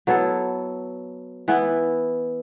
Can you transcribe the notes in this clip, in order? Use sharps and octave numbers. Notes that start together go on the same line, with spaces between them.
F#3 B3 E4 A4
E3 B3 E4